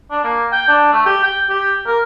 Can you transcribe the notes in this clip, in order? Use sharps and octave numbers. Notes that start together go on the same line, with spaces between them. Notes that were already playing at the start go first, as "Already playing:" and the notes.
D4
A#3
G5
D4
A3
G4
G5
G4
A#4